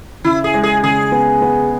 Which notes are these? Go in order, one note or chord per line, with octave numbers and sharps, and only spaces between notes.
C#3 E4
G#4
G#3
G#4
C#3 G#4
B3
B3